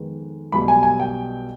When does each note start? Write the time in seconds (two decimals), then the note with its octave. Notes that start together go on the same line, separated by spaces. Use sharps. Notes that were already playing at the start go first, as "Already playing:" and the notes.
Already playing: F2 D#3 G#3 B3
0.52 B1 B2 G3 B5
0.68 G#5
0.83 G#5
1.00 G5